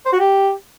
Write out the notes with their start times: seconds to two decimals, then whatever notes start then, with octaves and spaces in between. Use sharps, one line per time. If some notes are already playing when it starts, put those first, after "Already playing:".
0.05 C5
0.12 F#4
0.19 G4